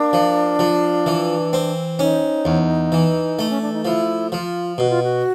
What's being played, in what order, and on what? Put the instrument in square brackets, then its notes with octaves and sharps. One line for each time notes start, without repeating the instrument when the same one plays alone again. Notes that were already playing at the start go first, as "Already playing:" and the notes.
Already playing: [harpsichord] A#3 [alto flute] D4
[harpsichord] F3
F3
E3
C4
[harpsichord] C#4 [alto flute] D#4
[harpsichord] E2
E3
A3
[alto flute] C#4
D4
D#4
[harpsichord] F3 [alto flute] E4
[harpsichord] F3 [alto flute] F4
[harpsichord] B2 [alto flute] F#4
[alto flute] F4
F#4